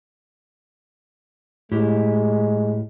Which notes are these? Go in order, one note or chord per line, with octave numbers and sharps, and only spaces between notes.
A2 G#3 E4 G4